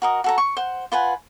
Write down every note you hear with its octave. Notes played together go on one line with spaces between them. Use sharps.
F#4 A#4 D#5
F#4 A4 A#5
C#6
C5 F#5
F4 B4 F#5 G#5